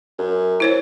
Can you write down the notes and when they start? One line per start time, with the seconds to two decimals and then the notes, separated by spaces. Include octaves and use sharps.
0.18 F#2
0.60 E4 C5 C#5